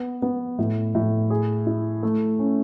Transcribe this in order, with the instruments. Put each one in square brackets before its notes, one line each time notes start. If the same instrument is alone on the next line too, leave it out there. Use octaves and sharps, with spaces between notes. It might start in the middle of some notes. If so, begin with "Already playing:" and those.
Already playing: [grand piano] B3
B3
A2
A2
G#4
E4
A3
C#4